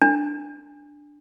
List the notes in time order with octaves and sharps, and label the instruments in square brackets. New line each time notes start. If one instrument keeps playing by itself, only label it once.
[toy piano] D4